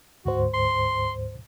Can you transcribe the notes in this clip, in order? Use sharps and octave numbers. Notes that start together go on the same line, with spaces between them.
D2 G#2 F#4 C5
C6